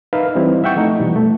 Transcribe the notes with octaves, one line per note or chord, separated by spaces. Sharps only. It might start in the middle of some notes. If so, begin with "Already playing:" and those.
D#4 A#4 B4 E5 F5
E3 G3 C4 D#4 E4
E5 F#5 G5 C#6
F3 A3 D#4 A4
B2 E3 G3
A3